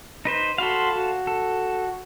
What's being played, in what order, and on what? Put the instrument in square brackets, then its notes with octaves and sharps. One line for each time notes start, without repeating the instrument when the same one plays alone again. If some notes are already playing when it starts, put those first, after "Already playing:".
[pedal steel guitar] D#4 B4 C5
[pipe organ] F#4 B5 C6 [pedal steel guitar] A4 C5 F5
[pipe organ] F#4
[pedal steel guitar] A4